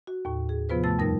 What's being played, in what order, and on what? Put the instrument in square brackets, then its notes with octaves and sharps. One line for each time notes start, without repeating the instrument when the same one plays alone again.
[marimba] F#4
D#2 A2
G#4
C3 F3 B3 F4 B4 C5
G#2 A3 A5 E6 A6
F2 G3 D#4 A#4 A#6